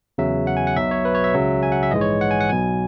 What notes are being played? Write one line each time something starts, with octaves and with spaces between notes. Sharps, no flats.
E2 C#3 F#3 E5
F#5
G#5
F#5
B1 B2 F#3 E5
C#5
B4
C#5
E5
C#2 C#3 F#3
G#5
F#5
E5
A#1 G#2 E3 G#3 D#5
C#5
F#5
G#5
F#5
B1 B2 F#3 G#5